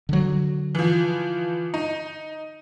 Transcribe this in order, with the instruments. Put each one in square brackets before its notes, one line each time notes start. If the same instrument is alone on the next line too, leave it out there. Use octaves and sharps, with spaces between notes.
[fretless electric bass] D3 F#3
[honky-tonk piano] E3 F3
D#4